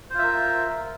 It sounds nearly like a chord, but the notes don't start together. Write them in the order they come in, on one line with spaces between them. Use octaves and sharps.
C5 F4 E5 A#4